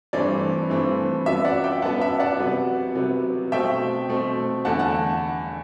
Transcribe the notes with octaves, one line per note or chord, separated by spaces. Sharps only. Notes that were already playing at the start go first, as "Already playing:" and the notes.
G2 E3 A3 C4 D5
G2 E3 A3 C4
F#2 F#3 B3 E5
D5 F#5
E5 G5
F#2 F#3 B3 F#5 A5
E5
D5 F#5
C3 F#3 B3
C3 F#3 B3
B2 A3 C4 E5 G5
B2 A3 C4
E2 D3 A3 F#5 A5
F#5 A5